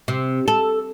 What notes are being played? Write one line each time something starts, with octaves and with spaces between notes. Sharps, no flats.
C3
A4